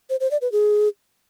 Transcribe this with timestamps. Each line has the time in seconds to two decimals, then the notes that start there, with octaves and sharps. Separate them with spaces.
0.10 C5
0.20 C5
0.31 D5
0.41 B4
0.52 G#4